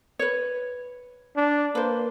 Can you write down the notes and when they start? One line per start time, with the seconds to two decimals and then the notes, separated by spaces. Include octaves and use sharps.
0.19 B4 C#5
1.36 D4
1.75 A#3 B4 C5